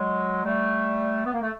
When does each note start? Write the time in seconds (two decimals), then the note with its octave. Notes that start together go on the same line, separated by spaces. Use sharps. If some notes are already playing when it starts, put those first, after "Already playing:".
Already playing: F#3 G#3
0.45 G3 A3
1.26 B3
1.33 A#3
1.42 A3